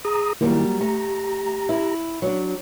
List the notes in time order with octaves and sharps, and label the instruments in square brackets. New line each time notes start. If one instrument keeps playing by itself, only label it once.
[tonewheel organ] G#4 A#5 D#6
[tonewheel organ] D#3 E4 [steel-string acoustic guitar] F#3 G3 A#3
[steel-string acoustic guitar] A3 [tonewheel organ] G4 A#5
[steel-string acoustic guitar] E4
F#3 D4